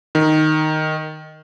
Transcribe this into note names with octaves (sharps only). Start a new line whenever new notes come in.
D#3